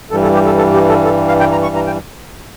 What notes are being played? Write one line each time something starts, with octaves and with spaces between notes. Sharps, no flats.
G2 E3 G3 A4
A4
G4
A4
A4
G4
A4
A4
F5
G5
A#5
C#6
A#5
G5